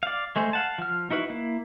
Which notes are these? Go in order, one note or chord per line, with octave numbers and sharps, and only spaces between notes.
D5 F5
G#3 A3 G#4 C5
F5 F#5 A5
F3 F6
D#4 E4 F#4 B4
A#3 E4